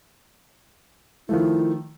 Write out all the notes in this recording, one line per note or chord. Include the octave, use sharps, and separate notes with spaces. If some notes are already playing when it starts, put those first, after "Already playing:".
D#3 F3 A3 E4